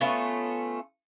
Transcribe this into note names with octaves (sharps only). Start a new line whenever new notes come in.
A3 B3 C#4 F4